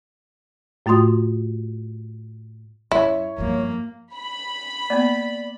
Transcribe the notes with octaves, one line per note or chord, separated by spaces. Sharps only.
A2 A3 F4 F#4 C6 D#6
F#2 E4 C#5
G2 F3 A#3
B5
A#3 B3 D5